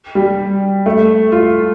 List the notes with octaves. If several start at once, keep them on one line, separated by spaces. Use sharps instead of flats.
G3
A3
F4